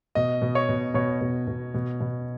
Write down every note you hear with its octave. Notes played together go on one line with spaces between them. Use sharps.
B2 D#5
B2
C#5
B2
B2 C#5
B2
B2
B2
B2